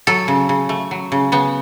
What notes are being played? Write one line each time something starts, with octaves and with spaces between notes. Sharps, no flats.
F#3 A4
C#3
C#3
A3
F#3
C#3
C#3 B3